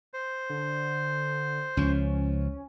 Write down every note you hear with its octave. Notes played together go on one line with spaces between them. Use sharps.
C5
D3
C#2 F3 C#4